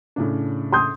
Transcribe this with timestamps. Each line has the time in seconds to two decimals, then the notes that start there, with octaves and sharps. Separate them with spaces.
0.16 A2 C#3 D4
0.72 C6 D#6 G6